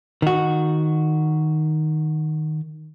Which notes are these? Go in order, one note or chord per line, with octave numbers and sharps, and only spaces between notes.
D#3 F#4